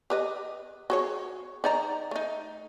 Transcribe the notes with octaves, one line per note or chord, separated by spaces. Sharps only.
G4 B4 D#5
F#4 G#4 C#5
D#4 D5 A#5
A3 D#4